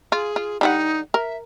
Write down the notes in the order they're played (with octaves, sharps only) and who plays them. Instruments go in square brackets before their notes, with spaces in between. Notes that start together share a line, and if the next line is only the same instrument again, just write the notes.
[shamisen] F4 [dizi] G#4
[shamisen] F4
[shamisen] D3 G3 F#5 [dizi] D#4
[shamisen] A#4 [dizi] E5